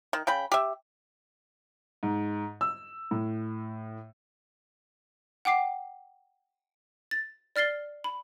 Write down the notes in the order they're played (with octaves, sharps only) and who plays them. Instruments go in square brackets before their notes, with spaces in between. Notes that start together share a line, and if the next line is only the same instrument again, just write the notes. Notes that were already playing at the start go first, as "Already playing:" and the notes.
[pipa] D#3
C#3 G5 B5
G4 E5
[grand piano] G#2
E6
A2
[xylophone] F#5 G5 D6 C7
A6
D5 F6 A6 C7 G7
B5